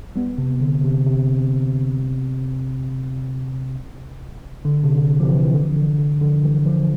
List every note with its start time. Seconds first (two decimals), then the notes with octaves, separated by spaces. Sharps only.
0.16 G3 B3
0.38 C3
0.61 D3
0.84 C3
1.06 C3
4.65 D3
4.84 C3
4.94 D3
5.20 F3
5.24 C3 E3
5.44 E3
5.54 D3
5.76 D3
5.99 D3
6.21 D3 F3
6.44 E3 G3
6.66 D3 F3